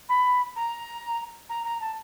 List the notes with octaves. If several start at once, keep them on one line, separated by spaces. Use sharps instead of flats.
B5
A#5
A#5
A#5
A5